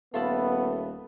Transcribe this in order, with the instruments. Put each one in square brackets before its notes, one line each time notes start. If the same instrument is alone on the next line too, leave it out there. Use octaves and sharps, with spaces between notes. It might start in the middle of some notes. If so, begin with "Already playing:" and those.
[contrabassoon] D#1 [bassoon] A3 [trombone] B3 [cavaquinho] F4 A4 B5